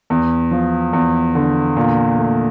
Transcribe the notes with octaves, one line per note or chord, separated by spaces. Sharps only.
E2
F3
E2
D3
A#2
A3